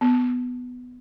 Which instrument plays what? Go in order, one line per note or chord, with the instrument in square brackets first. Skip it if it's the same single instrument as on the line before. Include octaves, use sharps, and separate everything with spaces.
[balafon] B3